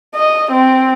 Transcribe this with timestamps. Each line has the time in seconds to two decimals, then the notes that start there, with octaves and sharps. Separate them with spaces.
0.15 D#5
0.52 C4